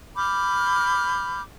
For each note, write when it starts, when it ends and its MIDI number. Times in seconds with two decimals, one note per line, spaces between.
0.16 1.41 83
0.16 1.41 86
0.16 1.41 89
0.16 1.41 91